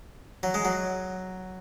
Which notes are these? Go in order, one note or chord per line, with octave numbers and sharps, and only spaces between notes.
F#3
G#3
F#3